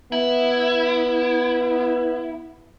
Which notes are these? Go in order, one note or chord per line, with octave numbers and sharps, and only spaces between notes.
B3 E4